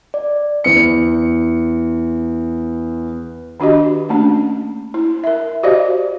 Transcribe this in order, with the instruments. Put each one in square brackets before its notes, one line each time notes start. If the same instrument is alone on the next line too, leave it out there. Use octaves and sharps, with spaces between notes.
[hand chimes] D5
[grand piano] E2 C#7
[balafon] D#3 D4 F#4 G4 D#5
A3 A#3 C#4 D4
E4
A#4 E5
F#4 G4 C5 D5 D#5 F5